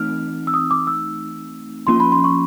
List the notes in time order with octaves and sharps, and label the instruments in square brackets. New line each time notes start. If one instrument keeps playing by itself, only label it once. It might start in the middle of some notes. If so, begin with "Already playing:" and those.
Already playing: [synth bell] E3 A3 C4 D#4 [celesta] F6
[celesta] E6
D#6
D6
E6
[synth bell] F3 A#3 C#4 F4 [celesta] C6
[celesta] B5
C6
C#6